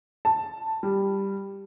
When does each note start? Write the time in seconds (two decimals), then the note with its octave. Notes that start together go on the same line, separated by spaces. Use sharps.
0.25 A5
0.83 G3